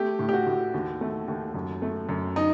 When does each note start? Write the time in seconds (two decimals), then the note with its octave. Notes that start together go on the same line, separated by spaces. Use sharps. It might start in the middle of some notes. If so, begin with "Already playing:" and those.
Already playing: A3 G4
0.19 A2
0.29 G4
0.33 F#4
0.47 A2
0.74 D#2
1.01 A3
1.28 D#2
1.54 F#2
1.82 A3
2.09 F#2
2.36 D#4